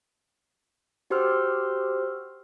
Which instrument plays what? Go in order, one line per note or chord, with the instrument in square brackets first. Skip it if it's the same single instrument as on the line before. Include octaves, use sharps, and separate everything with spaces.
[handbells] F#4 G4 C5 C6 E6 F6